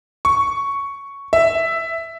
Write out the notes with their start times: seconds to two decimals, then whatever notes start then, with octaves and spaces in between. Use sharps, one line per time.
0.25 C#6
1.33 E5